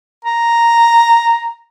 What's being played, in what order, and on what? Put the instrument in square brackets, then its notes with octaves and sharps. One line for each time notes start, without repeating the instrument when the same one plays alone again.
[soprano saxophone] A#5